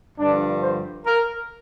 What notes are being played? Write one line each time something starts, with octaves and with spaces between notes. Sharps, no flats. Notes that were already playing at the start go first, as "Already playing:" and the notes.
G2 D3 F3 D4
C5
A#4